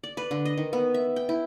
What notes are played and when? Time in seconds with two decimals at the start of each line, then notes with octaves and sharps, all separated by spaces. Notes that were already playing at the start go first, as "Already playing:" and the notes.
0.04 D5
0.17 B4
0.31 D3
0.45 D#5
0.58 D#3
0.73 B3
0.94 E5
1.16 G5
1.29 E4